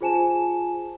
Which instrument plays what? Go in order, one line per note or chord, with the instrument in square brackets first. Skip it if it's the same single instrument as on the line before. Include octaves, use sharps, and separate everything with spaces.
[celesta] F4 G#4 C5 G#5 A5 E7